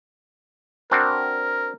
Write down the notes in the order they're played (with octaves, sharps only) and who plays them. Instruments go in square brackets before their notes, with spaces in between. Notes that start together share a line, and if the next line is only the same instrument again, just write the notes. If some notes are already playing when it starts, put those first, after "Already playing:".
[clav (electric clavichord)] C4 D4 F#4 [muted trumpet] A#4